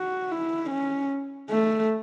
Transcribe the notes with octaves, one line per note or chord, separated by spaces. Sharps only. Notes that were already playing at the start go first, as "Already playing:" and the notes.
Already playing: F#4
E4
C#4
A3